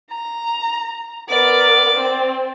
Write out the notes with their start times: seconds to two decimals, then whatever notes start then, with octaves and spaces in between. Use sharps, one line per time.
0.10 A#5
1.29 B3 A#4 D5
1.94 C4